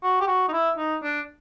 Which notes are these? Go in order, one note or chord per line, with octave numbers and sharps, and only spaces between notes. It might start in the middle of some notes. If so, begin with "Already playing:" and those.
F#4
G4
F#4
D#4
E4
D#4
D4